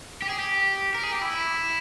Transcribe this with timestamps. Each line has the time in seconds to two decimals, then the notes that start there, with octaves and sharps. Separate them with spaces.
0.22 G4
0.29 G#4
0.38 G4
0.94 A#4
1.03 G#4
1.12 G4
1.22 E4